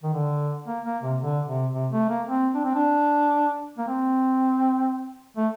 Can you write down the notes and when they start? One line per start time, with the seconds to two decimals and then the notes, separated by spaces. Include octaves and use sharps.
0.03 D#3
0.14 D3
0.67 A#3
0.85 A#3
1.03 C3
1.21 D3
1.47 C3
1.74 C3
1.92 A3
2.10 A#3
2.28 C4
2.55 D4
2.65 C4
2.75 D4
3.78 A#3
3.88 C4
5.37 A3